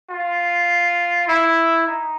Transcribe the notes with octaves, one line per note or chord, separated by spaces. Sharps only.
F4
E4
D#4